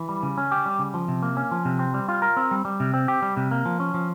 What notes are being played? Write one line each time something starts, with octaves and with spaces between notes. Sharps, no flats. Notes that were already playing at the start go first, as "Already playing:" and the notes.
Already playing: E3
G3
C#3
C#4
G4
G3
C#3
F3
C3
A#3
C#4
F3
C3
C4
G3
F4
A#4
C4
G3
G3
C3
C4
G4
G3
C3
A#3
F3
C#4
F3